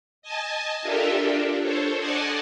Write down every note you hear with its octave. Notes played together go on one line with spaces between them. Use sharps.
D#5 G#5 A5
D4 F4 G4 A4 A#4 E5
D4
A4 C5 C#5
D5 D#5 F#5 G#5 A5